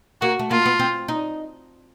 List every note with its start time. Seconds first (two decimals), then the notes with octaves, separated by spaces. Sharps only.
0.21 A#3 F#4
0.39 A3
0.50 A#3 F4
0.66 B3
0.79 C4
1.08 D#4